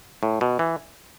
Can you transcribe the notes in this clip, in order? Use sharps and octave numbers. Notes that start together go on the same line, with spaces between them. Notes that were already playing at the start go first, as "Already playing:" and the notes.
A2
B2
E3